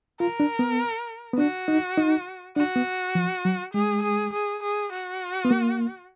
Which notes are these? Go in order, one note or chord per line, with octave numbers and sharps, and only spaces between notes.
F4 A#4
D4
B3
B3
D4 F#4
D#4
D#4
D4 F#4
B3
F3
F#3
G#3 G#4
G#4
G#4
G#4
F#4
B3
A#3